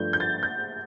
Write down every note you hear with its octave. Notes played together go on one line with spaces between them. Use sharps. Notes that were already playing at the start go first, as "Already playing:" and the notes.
Already playing: G2 F3 A3 G6
G6
A6
G6